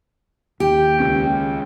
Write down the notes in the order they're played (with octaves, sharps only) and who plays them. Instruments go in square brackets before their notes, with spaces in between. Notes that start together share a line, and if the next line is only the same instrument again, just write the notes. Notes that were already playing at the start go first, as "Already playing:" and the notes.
[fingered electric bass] D#2 [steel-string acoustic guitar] G4 [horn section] G5
[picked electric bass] C#2 C#4